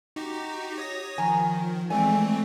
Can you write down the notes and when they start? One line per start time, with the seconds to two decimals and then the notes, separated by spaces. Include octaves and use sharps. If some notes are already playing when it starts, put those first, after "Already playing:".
0.16 D#4 F#4 G4
0.78 C#5 D#6 A#6
1.18 D#3 F3 G#5 A#5
1.90 E3 G#3 A3 C4 A4 D5 G#5